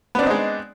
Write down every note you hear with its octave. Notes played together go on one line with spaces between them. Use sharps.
G#3 B3 C4 D4 D#4